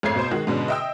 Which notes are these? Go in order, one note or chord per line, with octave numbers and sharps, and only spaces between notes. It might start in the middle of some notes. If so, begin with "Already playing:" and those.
G#1 F2 A3 C#5 G#6 C7
B2 C5
D#3 G#3 F#4
G#2 B2 D3 C#4
D#5 E5 G5 D#6 E6